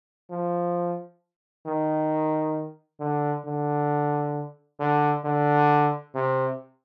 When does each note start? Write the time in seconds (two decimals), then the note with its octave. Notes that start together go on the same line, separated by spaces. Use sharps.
0.31 F3
1.66 D#3
3.00 D3
3.46 D3
4.80 D3
5.25 D3
6.15 C3